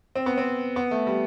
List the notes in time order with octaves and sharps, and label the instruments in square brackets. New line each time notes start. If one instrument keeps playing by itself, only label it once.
[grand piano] C4
B3
C4
B3
A3
G3